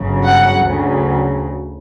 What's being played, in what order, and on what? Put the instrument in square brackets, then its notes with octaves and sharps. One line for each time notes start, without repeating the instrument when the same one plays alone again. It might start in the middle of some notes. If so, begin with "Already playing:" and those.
Already playing: [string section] G1 F#2 C#3 F#3
F#5
D2 C#3 F#3